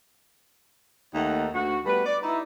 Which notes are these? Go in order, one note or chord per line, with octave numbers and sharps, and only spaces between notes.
D#2 D#3 A3 D#4 F#5
D2 F#4
G3 A3 B3 B4
D5
D#4 E4